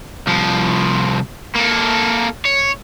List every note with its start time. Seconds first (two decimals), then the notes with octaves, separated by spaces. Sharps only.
0.27 C2 F3
1.55 A#3 A4
2.45 C#5